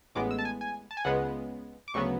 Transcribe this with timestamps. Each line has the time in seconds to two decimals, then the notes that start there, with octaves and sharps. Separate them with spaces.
0.15 A1 A2 G#3 B3 D6
0.31 E6
0.39 A5
0.45 G#5
0.61 G#5
0.91 A5
0.97 G#5
1.05 C#2 C#3 G#3 B3 F#5
1.88 D6
1.94 D2 C#3 F#3 B3 C#6